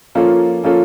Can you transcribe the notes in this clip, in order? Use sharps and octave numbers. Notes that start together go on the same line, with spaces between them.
F3 A#3 C#4 F4 A4
F3 A#3 C#4 F4 A4